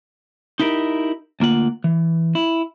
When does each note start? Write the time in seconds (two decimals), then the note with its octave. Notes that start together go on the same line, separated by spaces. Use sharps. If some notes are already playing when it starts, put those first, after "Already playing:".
0.60 D#4 E4 G4 A#4
1.40 D2 A#3 F4 F#5
1.84 E3
2.35 E4